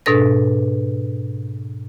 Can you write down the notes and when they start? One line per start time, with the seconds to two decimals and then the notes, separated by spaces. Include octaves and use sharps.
0.06 G#2 B2 D4 A4 B4 A#6